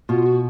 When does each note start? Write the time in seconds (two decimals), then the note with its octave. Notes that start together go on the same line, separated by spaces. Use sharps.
0.09 B2 F4
0.25 F#4